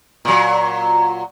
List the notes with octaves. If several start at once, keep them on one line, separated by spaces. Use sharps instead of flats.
A#2 F#3